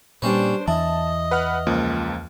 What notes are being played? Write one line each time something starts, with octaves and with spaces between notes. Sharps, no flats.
A#2 G3 A#3 C#4 D4 B4 C5
E2 E3 E4 D#5 A5
B4 F#5 F6
C#2 F3 A#3